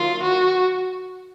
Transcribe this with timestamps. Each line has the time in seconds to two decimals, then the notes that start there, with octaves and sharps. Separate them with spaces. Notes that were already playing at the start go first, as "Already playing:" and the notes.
Already playing: D#3 F#3 A#3 F4
0.23 F#4